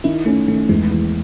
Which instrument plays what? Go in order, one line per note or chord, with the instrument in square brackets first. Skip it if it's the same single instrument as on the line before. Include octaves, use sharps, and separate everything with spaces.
[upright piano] D#3 [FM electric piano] E4
[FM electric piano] A3 [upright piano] C#4
[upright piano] D#3 [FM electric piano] A3
[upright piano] E2 [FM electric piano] G#3
[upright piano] E3